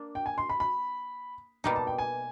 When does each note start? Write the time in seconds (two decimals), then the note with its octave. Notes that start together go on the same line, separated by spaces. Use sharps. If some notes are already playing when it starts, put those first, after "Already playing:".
Already playing: A#3 D4
0.15 G5
0.26 G#5
0.38 C6
0.50 B5
0.60 B5
1.64 B2 G3 A#3 D#4 A#5
1.76 A5
1.87 G5
1.98 G#5